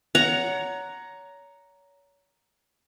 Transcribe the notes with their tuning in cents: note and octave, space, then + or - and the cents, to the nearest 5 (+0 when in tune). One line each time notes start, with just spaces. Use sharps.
C#5 +30 F#5 +0 A#5 +0